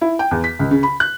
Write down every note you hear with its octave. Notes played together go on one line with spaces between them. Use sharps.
E4
G5
E2
B6
C#2
C#3
B5
F#6